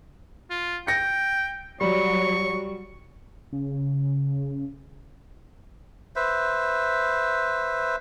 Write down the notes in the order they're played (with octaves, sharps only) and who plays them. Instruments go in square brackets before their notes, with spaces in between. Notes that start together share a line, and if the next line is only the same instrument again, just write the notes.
[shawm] F4
[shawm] G5 [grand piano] A#6 C#7
[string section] F#3 [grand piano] G3 [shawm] C#6
[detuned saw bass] C#3
[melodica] B4 C5 E5